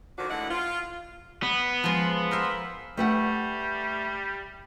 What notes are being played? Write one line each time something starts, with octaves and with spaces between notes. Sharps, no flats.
D3 D#3 F3 D4 F#4
A2 D3 E3 G#3 E4 F#5
F4
B3
F3 G#3
A#4 C5 E5
G3 A3 B4 F#5